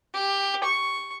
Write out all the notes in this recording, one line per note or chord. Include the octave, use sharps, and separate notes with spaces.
G4
C#6